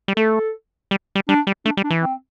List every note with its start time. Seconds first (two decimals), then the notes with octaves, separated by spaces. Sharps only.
0.08 G3
0.17 A3 A4
0.91 G3
1.15 G3
1.29 G3 D4
1.47 G3
1.65 A3 D4
1.77 G3
1.84 D4
1.90 E3
2.02 C4